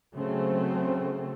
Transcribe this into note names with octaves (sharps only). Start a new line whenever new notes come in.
C#3 F#3 A3 C4